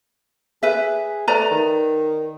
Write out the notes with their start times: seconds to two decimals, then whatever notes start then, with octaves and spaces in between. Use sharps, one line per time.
0.63 G#4 B4 E5
1.28 A3 B4 D5 A#5
1.51 D#3